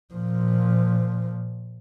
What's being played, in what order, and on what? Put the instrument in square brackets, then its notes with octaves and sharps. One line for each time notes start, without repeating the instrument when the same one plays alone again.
[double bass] A#2 F3